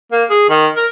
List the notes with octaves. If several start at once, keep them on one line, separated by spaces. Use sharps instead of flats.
A#3
G#4
D#3
A#4